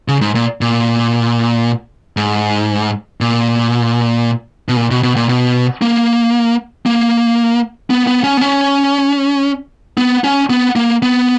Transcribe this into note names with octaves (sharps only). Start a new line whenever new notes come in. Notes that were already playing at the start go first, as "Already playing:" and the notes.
C#3
G#2
A#2
A#2
G#2
A#2
B2
A#2
B2
B2
A#2
B2
A#3
A#3
B3
B3
C#4
B3
C#4
B3
C#4
B3
A#3
B3